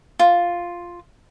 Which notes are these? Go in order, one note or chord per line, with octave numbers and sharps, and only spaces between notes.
F4